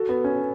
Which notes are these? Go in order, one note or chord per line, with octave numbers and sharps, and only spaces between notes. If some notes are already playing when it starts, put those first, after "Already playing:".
Already playing: F#4 A4
B3
C#4